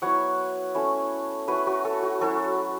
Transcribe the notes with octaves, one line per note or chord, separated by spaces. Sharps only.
F#3 B3 E4 C#5 F#5
A3 C#4 E4
A3 C#4 E4 F#4 B4
F#4 B4
A4
F#4
F#3 C#4 E4 A4